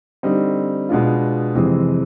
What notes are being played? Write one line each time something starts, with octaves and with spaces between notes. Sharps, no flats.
D3 G3 C4 D#4
B2 G#3 B3 D4 F4
F2 C3 E3 G#3 C4